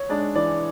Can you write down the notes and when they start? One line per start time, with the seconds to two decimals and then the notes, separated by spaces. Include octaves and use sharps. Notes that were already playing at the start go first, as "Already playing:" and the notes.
Already playing: C#5
0.09 G#3 D4 D5
0.35 E3 D5